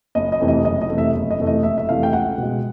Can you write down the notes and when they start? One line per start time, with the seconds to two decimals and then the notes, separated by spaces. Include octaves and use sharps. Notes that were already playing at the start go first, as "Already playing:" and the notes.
0.15 F#1 D#5
0.32 D#5
0.40 F2 C3 E3 A3
0.48 D#5
0.65 F#1 D#5
0.82 D#5
0.90 F2 C3 E3 A3
0.98 E5
1.14 F#1
1.31 D#5
1.39 F2 C3 E3 A3
1.47 D#5
1.63 F#1 E5
1.78 E5
1.89 F2 C3 E3 A3 F5
2.03 G5
2.13 C#2 F#5
2.38 B2 G#3